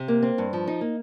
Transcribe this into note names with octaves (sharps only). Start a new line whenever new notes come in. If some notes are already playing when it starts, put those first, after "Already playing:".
Already playing: C3
A#3
C4
G2
F3
D#4
A#3